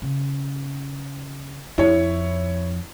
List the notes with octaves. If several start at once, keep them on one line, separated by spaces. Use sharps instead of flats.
C#3
F2 E4 C#5